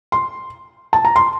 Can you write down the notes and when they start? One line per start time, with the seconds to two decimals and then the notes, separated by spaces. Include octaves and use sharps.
0.12 C6
0.93 A5
1.05 A#5
1.16 C6